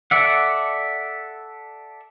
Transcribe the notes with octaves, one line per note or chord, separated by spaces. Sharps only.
A4 D5 E5 F#5